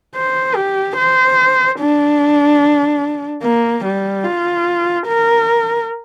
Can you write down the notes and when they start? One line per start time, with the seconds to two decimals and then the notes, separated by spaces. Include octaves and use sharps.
0.16 C5
0.56 G4
0.97 C5
1.79 D4
3.43 A#3
3.85 G3
4.25 F4
5.07 A#4